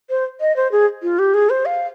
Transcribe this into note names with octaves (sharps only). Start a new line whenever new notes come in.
C5
D#5
C5
G#4
F4
G4
G#4
C5
F5